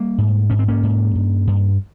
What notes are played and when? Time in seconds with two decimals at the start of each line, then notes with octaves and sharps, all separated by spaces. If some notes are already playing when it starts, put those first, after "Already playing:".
Already playing: G3 A#3
0.18 G#2
0.50 G#2 C#4
0.59 C4
0.68 A#3 C#4
0.83 G#2
1.15 G2
1.47 G2